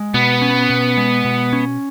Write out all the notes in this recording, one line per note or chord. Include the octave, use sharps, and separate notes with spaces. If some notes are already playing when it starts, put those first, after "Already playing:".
Already playing: G#3
B2 B3
C#4
B2
G#3
B2
C#4